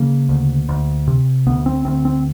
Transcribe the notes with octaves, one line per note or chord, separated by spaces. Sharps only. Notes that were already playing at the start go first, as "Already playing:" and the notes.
Already playing: C#3 A#3
D2
D2
C3
D2 B3
C4
D2 C4
C4